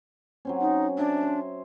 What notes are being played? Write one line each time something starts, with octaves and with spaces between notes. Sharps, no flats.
F#3 C4 C#4
D#4
D4 E5 G#5 A#5
C5